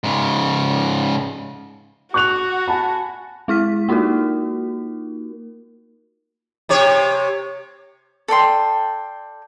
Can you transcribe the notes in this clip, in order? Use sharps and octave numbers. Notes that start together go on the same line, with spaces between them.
G#2 C#3
F#4 C#6 F#6 F7
G#5 A5 B5
G#3 E4 F6 B6
A#3 D#4 F4 F#4 A#4
C3 G4 C#5
A4 D5 G5 C6